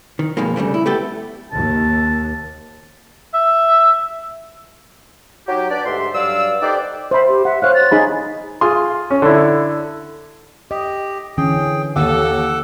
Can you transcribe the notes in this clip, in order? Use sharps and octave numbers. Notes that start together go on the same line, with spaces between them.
D#3
F2 B2 D#3 G#3 A#3
C#3 G3 A3 D4
E4
A3 B3 G4 A4
D#2 A5
E5
F#3 D#4 G4
D4 B4 D5
D2 G#2 G4 E5 C6
G2 F#3 D5 F5 E6
D#4 G4 A4 B4 C5 D5
C5 E5 B5
G4
E5 F#5
C5 C#5 F5 F#6
A6
D#4 G#4 B5
F4 G#4 C6
C#4
D3 E4
G4 D#5
D3 E3 C#4 G#4 G5
D#2 A4 F#5 D6 E6